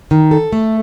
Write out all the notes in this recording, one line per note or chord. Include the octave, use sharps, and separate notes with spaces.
D#3
A4
A3